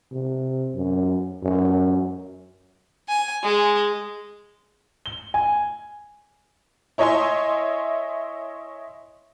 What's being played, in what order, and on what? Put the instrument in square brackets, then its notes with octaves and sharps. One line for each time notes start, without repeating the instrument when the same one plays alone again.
[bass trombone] C3
F#2
F#2
[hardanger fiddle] G#5
G#3
[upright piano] G7
G#5
[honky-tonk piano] E4 C#5 D#5 E5 G#5 C6